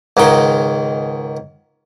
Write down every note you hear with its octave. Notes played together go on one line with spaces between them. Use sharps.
C#2 G#2 D#3 G5